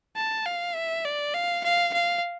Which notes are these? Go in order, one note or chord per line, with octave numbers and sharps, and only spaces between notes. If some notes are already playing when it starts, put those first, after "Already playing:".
A5
F5
E5
D5
F5
F5
F5